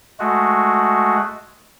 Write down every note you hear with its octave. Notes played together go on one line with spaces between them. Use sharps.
G#3 A3 F#4